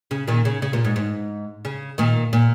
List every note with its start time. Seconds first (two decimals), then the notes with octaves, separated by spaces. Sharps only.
0.11 C#3
0.28 A#2 D#3
0.45 C#3
0.62 C#3
0.73 A#2
0.85 G#2
0.96 G#2
1.65 C#3
1.98 A#2 D#3
2.33 A#2